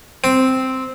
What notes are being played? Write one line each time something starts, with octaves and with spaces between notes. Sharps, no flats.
C4